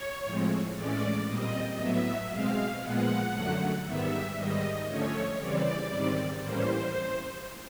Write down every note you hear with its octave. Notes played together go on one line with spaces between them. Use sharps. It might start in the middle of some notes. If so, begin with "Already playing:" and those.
Already playing: C#5
A2 F3 G#3 C4
A2 E3 G#3 C#4 D5
A#2 G3 C4 D#5
A2 F#3 B3 E5
B2 G#3 C4 F5
A#2 F3 G#3 B3 F#5
F#2 D3 F#3 A3
G#2 D#3 G3 B3 E5
G#2 D#3 G3 D#5
D3 F3 A3 C#4 C#5
C#3 E3 G3 C4 D5
G#2 D#3 G3 C4
A2 E3 G3 A#3 C#4 C5